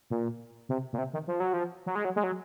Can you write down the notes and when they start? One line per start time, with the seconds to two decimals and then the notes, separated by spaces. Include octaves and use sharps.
0.10 A#2
0.69 C3
0.93 A#2
0.98 C3
1.13 D#3
1.27 F3
1.40 F#3
1.53 F3
1.86 F#3
1.95 G#3
2.05 F#3
2.16 G#3
2.24 F#3